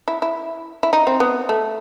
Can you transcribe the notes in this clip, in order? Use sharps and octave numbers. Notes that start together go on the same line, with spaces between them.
E4
E4
E4
D#4
C4
B3
A3